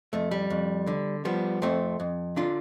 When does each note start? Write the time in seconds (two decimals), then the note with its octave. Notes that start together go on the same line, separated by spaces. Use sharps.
0.13 F2 A3
0.31 G3
0.50 F2
0.87 D3
1.25 F3 G3 B3
1.62 F2 A3 C4
2.00 F2
2.36 D3 D4 F4